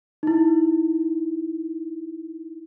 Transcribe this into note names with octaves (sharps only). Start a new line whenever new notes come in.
D#4 E4